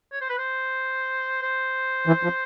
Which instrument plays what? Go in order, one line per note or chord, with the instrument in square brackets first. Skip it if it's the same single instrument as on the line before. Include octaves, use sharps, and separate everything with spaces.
[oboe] C#5
C5
B4
C5
C5
[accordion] E3
F3